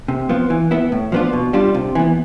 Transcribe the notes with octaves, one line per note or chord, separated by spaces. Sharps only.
C3
F3 B3 F4
E3
B3 E4
A2
F3 B3 D4 F4
B2
G3 D4 F4
C3
E3 B3